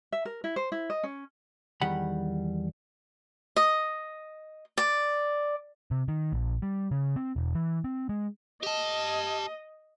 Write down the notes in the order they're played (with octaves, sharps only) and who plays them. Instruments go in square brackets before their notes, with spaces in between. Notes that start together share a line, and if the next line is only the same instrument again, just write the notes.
[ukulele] E5
A#4
E4
C5
E4
D#5
C#4
[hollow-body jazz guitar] E2 D#3 G3 F#5 B5
[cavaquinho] D#5
D5
[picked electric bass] C3
D#3
A#1
G3
C#3
C4
E1
E3
C4
G#3
[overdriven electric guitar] G4 A5 [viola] D#5